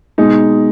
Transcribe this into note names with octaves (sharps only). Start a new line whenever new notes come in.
B2 G#3 D#4